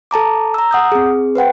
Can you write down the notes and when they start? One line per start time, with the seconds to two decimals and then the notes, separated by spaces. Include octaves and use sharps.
0.11 A4 A5 A#5 D6
0.54 A#5 E6
0.71 F#5 D#6 G6
0.92 C4 G#4
1.35 B4 C5 F#5 G5